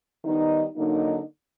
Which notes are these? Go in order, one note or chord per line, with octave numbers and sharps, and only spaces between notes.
D#3 G3 B3 D#4
D3 F#3 A#3 D#4